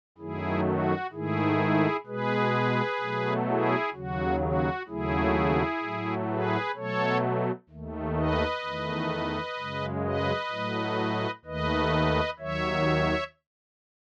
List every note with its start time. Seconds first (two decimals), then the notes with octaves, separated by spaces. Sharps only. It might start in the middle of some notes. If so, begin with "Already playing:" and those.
0.18 F#2 D#3 F#3 A3 E4 G#4
0.65 F#4
1.12 G#2 D#3 A3 E4 G#4
2.06 B2 G#3 G#4 B4
3.00 B2 F#3 A3
3.47 E4 G#4
3.94 D#2 C#3 F#3 F#4
4.40 F#4
4.88 D#2 C#3 F#3 A3 E4 G#4
5.82 A2 F#3 A3
6.29 G#4 B4
6.75 B2 F#3 A3 A4 C#5
7.69 D#2 D#3 A3
8.16 B4 D#5
8.63 E2 D#3 A3
9.57 F#2 C#3 G#3
10.04 B4 D#5
10.51 A2 F#3 A3
11.45 D#2 D#3 A3 B4 D#5
12.39 D#2 D#3 F#3 C#5 E5